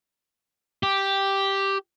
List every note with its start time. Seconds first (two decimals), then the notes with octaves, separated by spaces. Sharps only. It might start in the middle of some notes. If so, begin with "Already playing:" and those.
0.83 G4